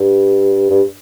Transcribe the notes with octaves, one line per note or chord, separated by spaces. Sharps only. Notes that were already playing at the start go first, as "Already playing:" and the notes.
Already playing: G2
G2